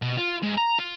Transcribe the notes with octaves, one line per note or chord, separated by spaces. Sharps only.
B2
F4
G#2
A#5
F4